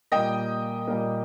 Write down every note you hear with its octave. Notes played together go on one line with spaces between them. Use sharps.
A#2 G3 A#3 D#5 G5
A#2 G3 A#3